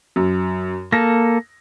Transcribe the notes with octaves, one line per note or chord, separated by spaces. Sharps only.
F#2
A#3 A4 A#6